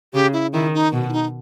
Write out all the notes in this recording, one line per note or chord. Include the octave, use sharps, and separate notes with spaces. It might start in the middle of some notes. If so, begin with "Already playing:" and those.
C#3 G4
E4
D#3 E4
D#4
B2
E4
D#4